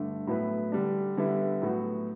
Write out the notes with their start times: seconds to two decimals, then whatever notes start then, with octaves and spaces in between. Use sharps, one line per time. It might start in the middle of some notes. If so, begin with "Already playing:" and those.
Already playing: G2 D3 A3
0.27 A2 F#3 B3 E4 B4
0.72 D3 G3 D4
1.17 D3 G3 B3 E4
1.62 A2 F#3 B3 F#4